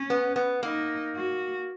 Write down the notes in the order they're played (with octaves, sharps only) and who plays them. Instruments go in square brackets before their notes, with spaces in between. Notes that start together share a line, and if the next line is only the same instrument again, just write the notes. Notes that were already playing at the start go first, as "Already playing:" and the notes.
Already playing: [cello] C#4
[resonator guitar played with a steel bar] B3
B3
[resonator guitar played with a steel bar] A#3 [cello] D#4
[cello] F#4